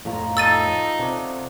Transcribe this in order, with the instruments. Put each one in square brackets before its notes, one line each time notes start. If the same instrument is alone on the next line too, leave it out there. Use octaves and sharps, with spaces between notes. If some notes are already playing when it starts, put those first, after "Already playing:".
[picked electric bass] F2 A2 [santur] F3 A#5 C#6
[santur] A3 A4 [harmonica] D#4 [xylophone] E6 A6 D#7
[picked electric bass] C3 [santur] A4 D5 F#5